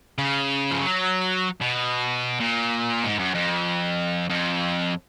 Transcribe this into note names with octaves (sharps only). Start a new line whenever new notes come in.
C#3
F3
F#3
B2
A#2
G#2
F#2
F2
F2